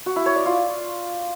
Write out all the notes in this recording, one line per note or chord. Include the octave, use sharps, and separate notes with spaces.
F#4
E4
C#5
D5
F4